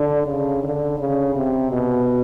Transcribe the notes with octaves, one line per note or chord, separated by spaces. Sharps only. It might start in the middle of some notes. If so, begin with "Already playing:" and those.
Already playing: D3
C#3
D3
C#3
C3
B2